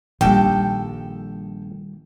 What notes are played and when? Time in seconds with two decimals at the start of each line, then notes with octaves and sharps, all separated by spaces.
0.21 A#1 D#3 G3 A4 G5